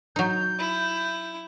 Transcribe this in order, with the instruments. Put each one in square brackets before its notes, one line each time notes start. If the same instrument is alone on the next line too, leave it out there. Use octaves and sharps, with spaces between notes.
[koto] F#3 D#4 [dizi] G6
[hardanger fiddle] E4